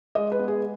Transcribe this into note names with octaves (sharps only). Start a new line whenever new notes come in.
G#3 D#5
B4
B3
G#4